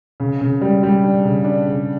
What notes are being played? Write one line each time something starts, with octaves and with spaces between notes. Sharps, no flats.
C#3
C#3
G3
G3
D4
C#3
D4
C#3